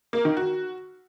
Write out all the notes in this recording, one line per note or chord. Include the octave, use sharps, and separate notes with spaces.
A#3
D#3
F#4